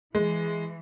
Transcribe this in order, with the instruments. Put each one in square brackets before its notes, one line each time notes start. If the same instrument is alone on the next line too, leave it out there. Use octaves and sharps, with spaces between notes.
[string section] E3 [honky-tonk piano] G#3